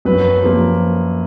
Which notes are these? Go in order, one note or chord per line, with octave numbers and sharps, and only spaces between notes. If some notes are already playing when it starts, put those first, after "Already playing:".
F#2 B4
F3 A#3